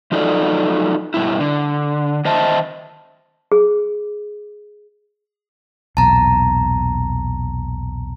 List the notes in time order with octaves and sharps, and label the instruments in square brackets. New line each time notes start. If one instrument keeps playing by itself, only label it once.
[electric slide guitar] F3 F#3 D#4 F4 A4 D5
G2 B2 E4
D3
D#3 C5 D#5 E5 A5
[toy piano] G#4
[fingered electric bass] B1 E2 A#2 [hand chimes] A5 A#5